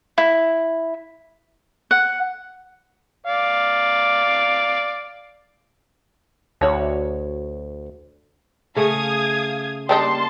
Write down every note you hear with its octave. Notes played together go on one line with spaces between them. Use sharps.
E4
F#5
D5 F5
D2 F#4 C#5 A5
C#3 A3 F5 D#6 G#6
G3 A#3 D4 D#4 A5 C6